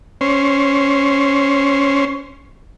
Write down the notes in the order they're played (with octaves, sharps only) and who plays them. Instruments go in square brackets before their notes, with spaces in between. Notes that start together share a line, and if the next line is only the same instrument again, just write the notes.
[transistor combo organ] C#4 C5